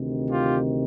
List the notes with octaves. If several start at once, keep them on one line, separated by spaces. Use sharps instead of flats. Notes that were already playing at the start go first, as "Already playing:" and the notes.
Already playing: D2 C3 D#3
F4 G4